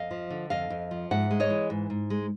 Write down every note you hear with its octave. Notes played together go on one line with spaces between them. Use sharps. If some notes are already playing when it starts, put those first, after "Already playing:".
Already playing: F2 D#5 F5
F3
D3
F2 D#5 F5
F2
F3
G#2 E5 F#5
G#3
C#5 D#5
E3
G#2
G#2
G#3